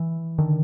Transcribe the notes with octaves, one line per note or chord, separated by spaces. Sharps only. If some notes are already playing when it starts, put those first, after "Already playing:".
Already playing: E3
D3 D#3